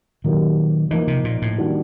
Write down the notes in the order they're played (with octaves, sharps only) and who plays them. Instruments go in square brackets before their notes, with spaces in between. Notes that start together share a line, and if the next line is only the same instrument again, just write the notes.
[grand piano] A#2 F#3 A#3 D#4 G4 [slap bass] D#3
[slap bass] E3 [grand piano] F3 A#3 D#4
[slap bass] C3
A#2
A2
[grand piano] D#3 G3 A#3 D4 F#4